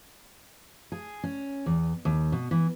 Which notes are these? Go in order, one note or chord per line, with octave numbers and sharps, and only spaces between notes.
G#4
C#4
E2
D#2
B2
E3